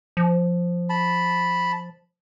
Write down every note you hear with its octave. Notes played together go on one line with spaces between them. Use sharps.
F3
A5 B5